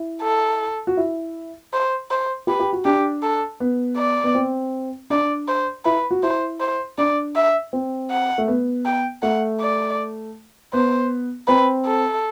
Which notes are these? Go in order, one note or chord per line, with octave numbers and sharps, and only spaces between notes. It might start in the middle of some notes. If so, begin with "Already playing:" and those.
Already playing: E4
A4
F#4
E4
C5
C5
G4 B4
G4
F#4
D4 G4
A4
B3
D5
B3
C4
D4 D5
C5
E4 B4
F#4
E4 C5
C5
D4 D5
E5
C4
F#5
A3
B3
G5
A3 F#5
D5
B3 C5
C4 B4
A4